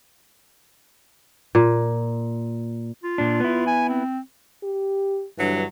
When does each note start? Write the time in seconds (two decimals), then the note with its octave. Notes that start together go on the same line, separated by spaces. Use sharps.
1.55 A#2
3.04 F4
3.18 A#2 D4
3.40 B3 E4
3.67 G#5
3.89 C4
4.63 G4
5.38 G2 D3 E3 F#3